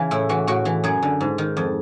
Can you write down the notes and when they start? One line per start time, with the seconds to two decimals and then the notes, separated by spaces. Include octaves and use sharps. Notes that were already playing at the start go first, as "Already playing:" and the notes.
Already playing: C#3 E3
0.11 A2 E4
0.29 E3 F#4
0.47 A2 F#4
0.65 E3
0.84 F#2 G#4
1.03 D3
1.21 G#2
1.38 D#3
1.57 F2